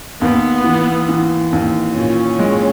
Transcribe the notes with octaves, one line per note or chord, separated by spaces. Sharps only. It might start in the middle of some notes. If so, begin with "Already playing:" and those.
D#2 B3
E3
E3
D#2
A#2 C#4
G#3